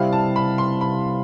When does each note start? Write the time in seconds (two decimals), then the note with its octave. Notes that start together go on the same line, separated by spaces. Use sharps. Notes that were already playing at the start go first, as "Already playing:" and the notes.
Already playing: C3 G3 C4 E4 F5
0.13 A5
0.36 B5
0.58 C6
0.81 B5